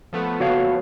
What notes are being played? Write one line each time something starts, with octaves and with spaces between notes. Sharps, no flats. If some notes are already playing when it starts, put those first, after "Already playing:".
F3 A3 B3
F#4 C#5 F5